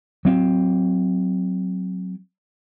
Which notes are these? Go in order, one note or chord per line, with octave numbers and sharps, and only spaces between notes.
F#3 C4